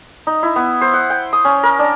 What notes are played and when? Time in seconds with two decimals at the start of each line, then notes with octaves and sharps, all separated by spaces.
0.27 D#4
0.43 E4
0.56 B3
0.81 C5
0.94 F#5
1.10 G5
1.33 D#6
1.45 C#4
1.63 A#4
1.79 D4